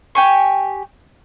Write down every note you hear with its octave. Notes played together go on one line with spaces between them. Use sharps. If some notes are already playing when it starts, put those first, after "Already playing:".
G4 G#5 C#6